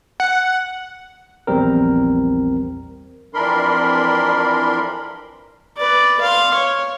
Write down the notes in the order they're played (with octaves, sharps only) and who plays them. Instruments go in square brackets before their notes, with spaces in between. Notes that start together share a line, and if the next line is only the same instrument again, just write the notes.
[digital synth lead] F#5
[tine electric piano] A#1 E2 G3 C4 A#4
[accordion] F2 E3 D4 A#4 B5 C6
[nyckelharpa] B4 D5
F5 C6
C#5